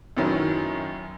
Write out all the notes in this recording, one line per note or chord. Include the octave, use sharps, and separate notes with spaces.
F#2 D#3 F#3 C#4 E4